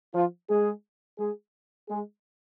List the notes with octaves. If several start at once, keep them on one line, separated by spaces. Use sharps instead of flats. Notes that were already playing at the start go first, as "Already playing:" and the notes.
F3 F4
G#3 G#4
G#3 G#4
G#3 G#4